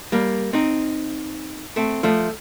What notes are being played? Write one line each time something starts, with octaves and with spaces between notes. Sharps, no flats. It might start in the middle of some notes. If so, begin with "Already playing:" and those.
G3 A#3
C4 D#4
A3 C4
F3 A3